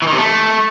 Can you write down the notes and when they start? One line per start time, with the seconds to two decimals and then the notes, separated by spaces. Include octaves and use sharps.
0.02 E3
0.07 D#3
0.13 C3
0.18 A3